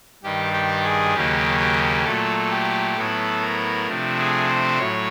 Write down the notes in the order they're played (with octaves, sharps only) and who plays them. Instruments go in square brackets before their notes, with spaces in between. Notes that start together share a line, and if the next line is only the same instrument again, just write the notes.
[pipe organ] G2 D#3 G3 G4
G4
G#4
D#2 C#3 F#3 A#3 G4
G4
A#2 F#3 A3 A4
G4
A2 F#3 B3 E4 A4
A#4
C3 F3 A3 D4
G#4
C5
A2 F#3 C#5